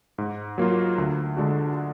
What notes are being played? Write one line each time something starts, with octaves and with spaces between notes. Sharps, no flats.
G#2
F#3 A#3 F4
D2
D3 G#3 D4 F#4